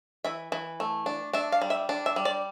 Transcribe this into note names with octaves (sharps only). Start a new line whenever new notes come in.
E3 E5
E3
A3
D4
D4 E5
F5
G3
E5
D4
E5
G3
D5